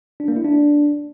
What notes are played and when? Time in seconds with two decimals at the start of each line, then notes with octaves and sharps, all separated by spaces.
0.20 D4
0.28 A#3
0.36 E4
0.45 D4